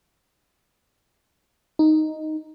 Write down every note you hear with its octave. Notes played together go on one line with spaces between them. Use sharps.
D#4